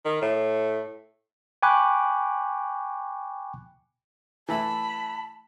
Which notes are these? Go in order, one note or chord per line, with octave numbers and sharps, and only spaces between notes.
D#3
A2
G5 G#5 B5 C#6 D6 F#6
E3 A3 E5 A5 B5